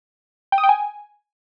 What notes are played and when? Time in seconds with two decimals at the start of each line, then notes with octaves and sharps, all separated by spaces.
0.52 G5
0.58 D#6
0.63 G5
0.69 G#5